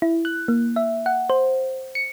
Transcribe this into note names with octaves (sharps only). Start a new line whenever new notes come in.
E4
F#6
A#3
E5
F#5
C5
C#7